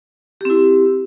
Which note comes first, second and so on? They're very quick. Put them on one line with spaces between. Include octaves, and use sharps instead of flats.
G4 C4 E4